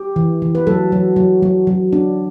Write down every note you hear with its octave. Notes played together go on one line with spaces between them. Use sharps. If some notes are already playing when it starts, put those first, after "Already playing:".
Already playing: G4
E3
E3
B4
F#3 A4
F#3
F#3
F#3
F#3
D4